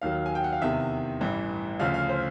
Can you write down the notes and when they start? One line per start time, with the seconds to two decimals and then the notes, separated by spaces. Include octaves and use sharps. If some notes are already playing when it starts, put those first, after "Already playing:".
0.02 D#2 D#3 F#3 F5
0.26 G#5
0.35 G5
0.44 F#5
0.53 F5
0.61 E2 C3 D#3 E5
1.21 A1 G2 E3
1.79 D2 C#3 F3 F5
1.94 F5
2.09 C5